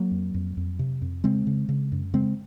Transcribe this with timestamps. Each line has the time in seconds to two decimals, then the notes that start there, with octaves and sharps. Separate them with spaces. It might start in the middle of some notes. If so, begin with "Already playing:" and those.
Already playing: F#3 A#3
0.11 F2
0.34 F2
0.57 F2
0.79 C3
1.02 F2
1.24 C#3 G#3 C4
1.47 C#3
1.69 C#3
1.92 F#2
2.14 C#3 G#3 C4